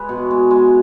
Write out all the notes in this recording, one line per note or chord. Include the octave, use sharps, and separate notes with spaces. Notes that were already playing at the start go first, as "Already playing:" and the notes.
Already playing: G#3 B4
B2
G#3
G#3